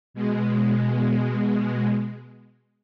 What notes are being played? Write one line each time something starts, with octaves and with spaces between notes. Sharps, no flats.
B2 G#3